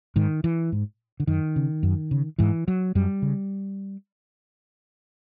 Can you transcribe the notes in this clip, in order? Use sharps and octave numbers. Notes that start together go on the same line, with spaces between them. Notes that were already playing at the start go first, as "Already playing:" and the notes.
G#2 D#3
E3
G#2
D3
F#2 D#3
C#3
F#2
C#3
G#2 E3
F#3
F#2 G3
C#3